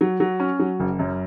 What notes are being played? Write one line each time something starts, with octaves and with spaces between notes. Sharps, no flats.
F#3
F#3
C#4
F#3
F#1
F#2